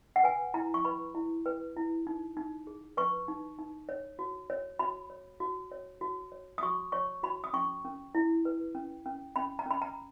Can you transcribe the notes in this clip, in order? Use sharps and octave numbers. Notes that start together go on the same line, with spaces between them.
F#5
B4 G#5
E4 A#5
C#6
B4 B5
E4
B4
E4
D#4
D#4
G#4
B4 C#6
D#4
D#4
C#5
F#4
C#5
F#4 B5
C#5
F#4
C#5
F#4
C#5
D#6
F#4 C#6
C#5 C#6
F#4 B5
D#6
C#4 C#6
C#4
E4
B4
C#4
C#4
C#4 B5
A#5
C#4 B5
A#5